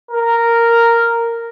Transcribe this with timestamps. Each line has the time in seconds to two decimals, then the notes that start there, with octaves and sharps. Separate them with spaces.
0.11 A#4